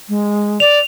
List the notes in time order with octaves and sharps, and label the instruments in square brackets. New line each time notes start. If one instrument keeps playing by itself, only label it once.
[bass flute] G#3
[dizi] D5 [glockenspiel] F7